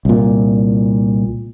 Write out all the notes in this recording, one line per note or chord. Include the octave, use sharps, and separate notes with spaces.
C2 A#2